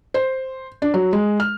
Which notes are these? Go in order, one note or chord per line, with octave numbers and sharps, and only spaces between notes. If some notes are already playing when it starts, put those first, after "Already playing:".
C5
D4
F#3
G#3
F6